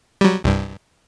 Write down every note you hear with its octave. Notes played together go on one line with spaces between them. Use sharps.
F#3 G3
C2 G2